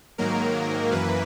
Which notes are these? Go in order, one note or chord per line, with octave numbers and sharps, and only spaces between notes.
G#2 D#3 F#3 A#3 A#4
F#2 E3 A#3 B4